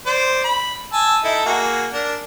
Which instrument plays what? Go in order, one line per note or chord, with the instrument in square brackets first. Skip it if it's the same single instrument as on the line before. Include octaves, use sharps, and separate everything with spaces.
[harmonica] C5 D5
B5
G#5 A5 E6
D#4 E4 A4
A#3 F#4 G#4
D4 A#4